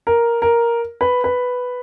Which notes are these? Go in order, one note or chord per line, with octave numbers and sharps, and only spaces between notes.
A#4
A#4
B4
B4